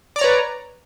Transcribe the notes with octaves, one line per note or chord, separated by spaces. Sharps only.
B4 C#5 D5 A#5